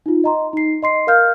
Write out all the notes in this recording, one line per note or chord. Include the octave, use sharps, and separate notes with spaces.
D#4 F4
D#5 A#5 C6
D#4 C7
D#5 C6 C7
A#4 F5 F6 G6